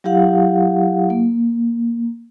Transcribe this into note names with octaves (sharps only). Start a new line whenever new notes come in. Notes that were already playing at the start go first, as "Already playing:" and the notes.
F#3 E4 G4 F5 F#5
A#3